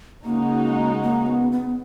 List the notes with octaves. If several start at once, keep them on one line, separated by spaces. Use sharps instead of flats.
C#3 G#3 A#3 D#4 F#4
A#3
B3
B3